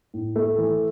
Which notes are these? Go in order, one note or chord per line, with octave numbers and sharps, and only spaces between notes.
A2
A3
E3